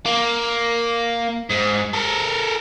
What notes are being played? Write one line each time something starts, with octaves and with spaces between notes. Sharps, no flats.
A#3
G#2
A4 A#4